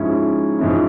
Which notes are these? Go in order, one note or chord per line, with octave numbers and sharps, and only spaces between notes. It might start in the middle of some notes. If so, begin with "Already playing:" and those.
Already playing: G#2 F3 G#3 C#4 E4
G#2 F3 G#3 C#4 E4